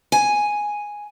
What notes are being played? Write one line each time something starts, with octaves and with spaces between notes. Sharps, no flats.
G#5